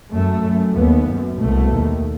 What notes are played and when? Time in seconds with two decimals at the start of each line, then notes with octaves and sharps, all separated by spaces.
0.12 F#2 A3
0.44 F#2
0.75 D#2 B3
1.07 F#2
1.38 C2 B2 A3
1.70 D#2